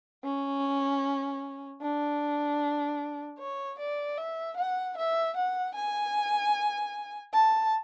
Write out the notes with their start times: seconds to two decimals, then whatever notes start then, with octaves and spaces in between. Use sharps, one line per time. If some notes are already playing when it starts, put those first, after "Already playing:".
0.24 C#4
1.82 D4
3.39 C#5
3.79 D5
4.18 E5
4.57 F#5
4.97 E5
5.37 F#5
5.75 G#5
7.33 A5